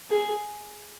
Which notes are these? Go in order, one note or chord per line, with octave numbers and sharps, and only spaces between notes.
G#4